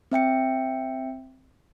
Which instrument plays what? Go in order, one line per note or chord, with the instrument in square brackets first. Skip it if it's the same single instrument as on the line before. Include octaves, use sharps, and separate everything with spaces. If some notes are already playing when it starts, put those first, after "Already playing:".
[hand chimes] C4 E5 G5 C#7